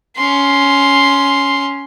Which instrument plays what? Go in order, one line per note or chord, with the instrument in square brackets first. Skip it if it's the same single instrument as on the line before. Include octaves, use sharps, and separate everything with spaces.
[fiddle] C#4 C6